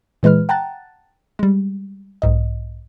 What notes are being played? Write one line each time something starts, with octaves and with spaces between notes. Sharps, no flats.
A#2 E3 G#3 B4 F6
F#5 G5 A5 A#5 F#6 A6
G3 G#3
B1 G#2 D#5